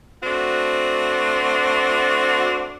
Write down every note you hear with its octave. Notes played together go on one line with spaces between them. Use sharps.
A3 C4 D4 F#4